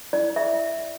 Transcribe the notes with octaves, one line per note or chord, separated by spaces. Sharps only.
E4 D5
E5